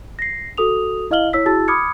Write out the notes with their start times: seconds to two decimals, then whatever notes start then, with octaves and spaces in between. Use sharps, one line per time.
0.19 A#6 C7
0.58 F#4 A4 D#6 F7
1.11 E4 D#5 F5 F6 F#7 G7
1.33 E4 C#5 E6 B6
1.46 E4 F#4 G#4 A5 E6 A6
1.68 B5 D6 D#6 F6 G#6 C#7